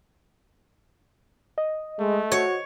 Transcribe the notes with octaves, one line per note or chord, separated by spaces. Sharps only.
D#5
G#3 A3
F#4 C#5